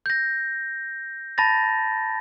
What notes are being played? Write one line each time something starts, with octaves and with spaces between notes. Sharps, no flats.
G6 A#6
A5 B5 A6 A#6